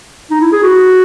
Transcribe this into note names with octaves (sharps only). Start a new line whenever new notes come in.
D#4
E4
G#4
F#4